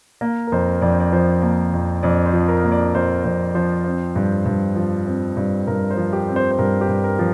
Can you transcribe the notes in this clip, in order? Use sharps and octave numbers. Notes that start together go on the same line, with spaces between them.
A#3
A#4
F2 C5
F2 D5
C5
D5
F3 C5
A#3
F2
F2 D5
C5
F3
A#4
A#3
D5
F2 C5
F2 C5
F3 C5
C4
G2
G2
F3
C4
G2
G2 A#4
C5
F3
G4
C4
C5
C5
G2 A#4
G4
G2
A#4
F3